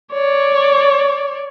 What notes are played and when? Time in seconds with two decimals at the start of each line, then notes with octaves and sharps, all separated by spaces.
0.12 C#5 D5